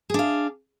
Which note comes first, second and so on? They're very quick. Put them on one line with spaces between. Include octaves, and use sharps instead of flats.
G#4 D4 F5